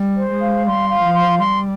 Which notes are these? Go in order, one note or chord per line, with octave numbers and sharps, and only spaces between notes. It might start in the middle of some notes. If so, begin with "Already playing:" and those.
Already playing: G3
C5
G#3
F5
G3 C6
F5
F3
C6
G3 C6